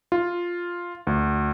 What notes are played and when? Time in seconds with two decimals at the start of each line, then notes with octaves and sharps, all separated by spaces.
0.12 F4
1.07 D2